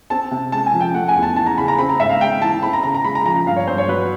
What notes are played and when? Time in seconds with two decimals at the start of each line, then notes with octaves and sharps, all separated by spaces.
0.10 C4 A5
0.31 C3
0.52 G#3 A5
0.66 G#5
0.74 F3
0.81 G5
0.94 A3 F#5
1.08 G#5
1.16 E2
1.23 A5
1.36 E3 A5
1.46 A#5
1.58 C#3 B5
1.68 A#5
1.78 C4 B5
1.89 A#5
1.99 G#2 E5
2.09 F5
2.21 G#3 G5
2.41 E3 A5
2.62 C4 B5
2.73 A#5
2.83 C#3 A#5
2.95 A#5
3.05 G#3 B5
3.15 A#5
3.25 F3 A#5
3.36 A#5
3.46 G2 F5
3.56 C#5
3.67 G2 C5
3.78 C#5
3.88 F#3 B4